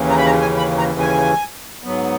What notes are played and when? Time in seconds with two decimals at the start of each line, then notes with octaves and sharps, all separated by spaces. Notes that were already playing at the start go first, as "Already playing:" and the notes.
Already playing: D#2 C#3 E3
0.10 A#5
0.17 B5
0.26 A#5
0.42 G#5
0.57 B5
0.78 A#5
0.99 G#5
1.84 G#2 F#3 B3